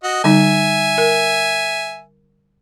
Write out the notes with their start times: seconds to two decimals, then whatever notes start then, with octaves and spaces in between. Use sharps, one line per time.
0.04 F#4 D#5
0.24 D3 G3 D#4 E5 G#5
0.98 A#4